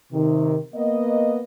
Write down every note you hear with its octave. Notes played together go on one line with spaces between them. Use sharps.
C3 D#3
A#3 B3 D#5